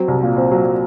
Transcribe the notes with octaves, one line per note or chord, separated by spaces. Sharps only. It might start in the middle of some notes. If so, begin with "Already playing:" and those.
Already playing: F#3 C4
C2
A#2
C4
F#3